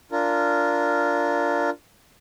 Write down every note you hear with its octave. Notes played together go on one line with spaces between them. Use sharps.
D4 F4 A#4